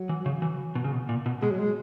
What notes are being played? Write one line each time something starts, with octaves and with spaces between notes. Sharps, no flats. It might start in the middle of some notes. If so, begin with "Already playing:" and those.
Already playing: F#3
E3
C#3
E3
B2
C#3
B2
A#2
B2
B2 G#3
F#3
G#3